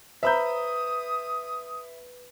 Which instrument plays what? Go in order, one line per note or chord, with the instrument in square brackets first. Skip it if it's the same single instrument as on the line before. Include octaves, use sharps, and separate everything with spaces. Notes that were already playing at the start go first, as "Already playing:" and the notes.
[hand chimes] B4 [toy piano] C5 A#5 [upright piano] E5 B5 G6 [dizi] D#6